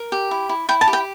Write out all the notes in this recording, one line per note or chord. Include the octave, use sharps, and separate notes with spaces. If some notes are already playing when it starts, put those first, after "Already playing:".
Already playing: A#4
G4
E4
E4
E4 G5
A5
G4
G5